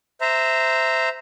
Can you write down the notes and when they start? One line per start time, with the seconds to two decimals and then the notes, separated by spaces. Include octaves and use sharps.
0.21 C5 E5 A#5